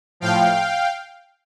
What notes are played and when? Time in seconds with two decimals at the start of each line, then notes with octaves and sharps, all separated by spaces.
0.20 A2 F3 F5 G5